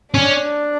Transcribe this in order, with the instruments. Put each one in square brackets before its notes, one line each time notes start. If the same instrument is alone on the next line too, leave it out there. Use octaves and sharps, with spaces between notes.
[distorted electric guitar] C#4 [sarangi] D4